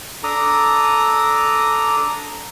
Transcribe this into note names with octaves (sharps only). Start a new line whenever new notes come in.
D4 A4 A#5 D6 D#6